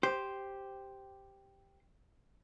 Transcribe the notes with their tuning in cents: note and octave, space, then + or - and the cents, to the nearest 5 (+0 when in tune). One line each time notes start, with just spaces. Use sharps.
G4 +0 C5 +0